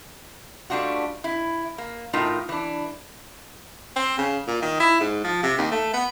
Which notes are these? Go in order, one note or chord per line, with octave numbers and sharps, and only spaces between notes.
G3 A3 D4 F4 F#4
E4
A#3
A2 A3 D#4 F4 A#4
E3 D4
C4
C#3
A#2
D#3
E4
G#2
F3
C3
D#2
A3
B3